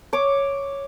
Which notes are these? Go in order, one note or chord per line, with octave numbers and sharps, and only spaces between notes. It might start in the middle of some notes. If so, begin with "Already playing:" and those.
C#5 D6